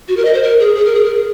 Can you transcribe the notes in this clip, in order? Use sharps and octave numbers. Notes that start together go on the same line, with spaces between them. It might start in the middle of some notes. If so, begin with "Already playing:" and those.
F#4
A#4
D#5
C5
A#4
G#4
G#4
A#4
G#4
A#4
G#4